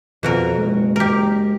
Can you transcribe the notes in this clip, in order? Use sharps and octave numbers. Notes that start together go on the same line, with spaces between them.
F2 B2 F#4 A#4
F#1 G#3
G4 A#4